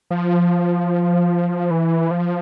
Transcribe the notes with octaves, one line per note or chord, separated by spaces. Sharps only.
F3
E3
F3